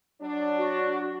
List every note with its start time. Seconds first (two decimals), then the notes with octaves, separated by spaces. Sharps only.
0.21 F#3 D4
0.58 F#4